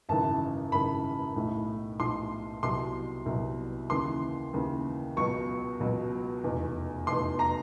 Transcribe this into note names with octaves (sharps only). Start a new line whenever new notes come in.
G#1 F#2 C#3 E3 A5
G#1 F#2 C#3 E3 B5
B1 A2 F3
B1 A2 F3 C6
C2 B2 F#3 C6
C2 B2 F#3
D#2 C#3 E3 C6
D#2 C#3 E3
C#2 B2 F#3 C#6
C#2 B2 F#3
F1 E2 B2
F1 E2 B2 C6
A#5